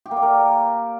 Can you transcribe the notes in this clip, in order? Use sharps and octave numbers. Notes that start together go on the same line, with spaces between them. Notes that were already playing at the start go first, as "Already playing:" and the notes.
G4
A#3
D5
A#4